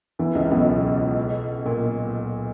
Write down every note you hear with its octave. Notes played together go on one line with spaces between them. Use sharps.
E2 E3
C#2 C#3
B1 B2
A#2